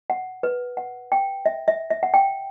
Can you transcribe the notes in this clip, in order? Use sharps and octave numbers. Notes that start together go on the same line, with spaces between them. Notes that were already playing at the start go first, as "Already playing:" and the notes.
F#5
B4
F#5
G5
E5
E5
E5
F#5
G5